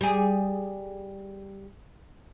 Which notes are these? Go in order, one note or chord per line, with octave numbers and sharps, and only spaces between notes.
G3 G#4